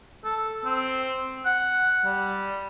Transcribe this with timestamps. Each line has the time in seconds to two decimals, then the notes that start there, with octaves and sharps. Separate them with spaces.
0.24 A4
0.65 C4
1.46 F#5
2.04 G3